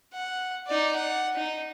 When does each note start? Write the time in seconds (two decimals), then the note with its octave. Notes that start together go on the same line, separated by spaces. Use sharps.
0.13 F#5
0.67 D#4 D5
0.95 F#5
1.35 D#4